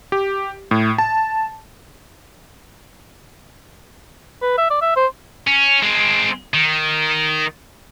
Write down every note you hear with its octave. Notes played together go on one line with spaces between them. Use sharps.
G4
A2
A5
B4
E5
D5
E5
C5
C#4
G#3 C4
D#3